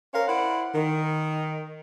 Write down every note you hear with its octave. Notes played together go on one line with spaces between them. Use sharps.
C#4 A#4 C5 C#5 F5
E4 C5 D5 F#5
D#3